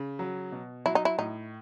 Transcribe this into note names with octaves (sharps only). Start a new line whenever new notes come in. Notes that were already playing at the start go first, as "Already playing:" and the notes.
Already playing: C#3
F#3
B2
F#3 E4
D#4
E4
A2 D#4